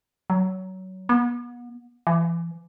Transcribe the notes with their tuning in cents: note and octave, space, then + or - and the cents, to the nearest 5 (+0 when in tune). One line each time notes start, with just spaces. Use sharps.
F#3 +20
B3 -35
E3 +35